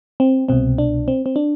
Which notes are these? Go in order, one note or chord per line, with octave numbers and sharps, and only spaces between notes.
C4
C2 B2 C4
D4
C4
C4
D4